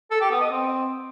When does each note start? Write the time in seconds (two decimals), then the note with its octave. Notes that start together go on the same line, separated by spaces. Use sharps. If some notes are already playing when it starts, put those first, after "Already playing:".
0.11 A4
0.21 G4
0.31 B3
0.41 D#5
0.51 C4